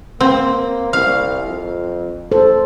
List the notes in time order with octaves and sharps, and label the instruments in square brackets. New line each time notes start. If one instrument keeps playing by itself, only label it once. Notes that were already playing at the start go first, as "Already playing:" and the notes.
[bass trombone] A#3 [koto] C4
[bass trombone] C2 [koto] F5
[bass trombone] F2
[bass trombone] A1 [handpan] A4 C5